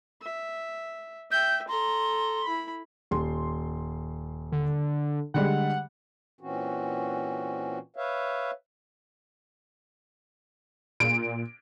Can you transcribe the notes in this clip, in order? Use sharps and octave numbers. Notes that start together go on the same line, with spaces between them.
E5
E5 G5 G6
A4 A#5 C6
E4 B5
D#1 C6
D3
D3 G3 G#3 F#5
A#2 E3 C4 C#4 F#4
B4 C#5 E5 F5
A#2 D7